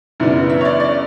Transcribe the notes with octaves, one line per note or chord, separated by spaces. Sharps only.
F#2 C#3 E3 B3 D4
E5
C#5
D5
D5